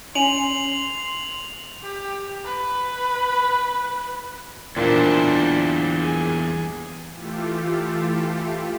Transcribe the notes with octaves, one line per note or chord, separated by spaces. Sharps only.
C#4 C6 F7 F#7
G4
B4
E2 A#2 G3 D4 C5
G#4
E3 A3 F4 G4 A4